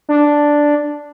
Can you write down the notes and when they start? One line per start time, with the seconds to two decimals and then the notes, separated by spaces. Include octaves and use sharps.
0.09 D4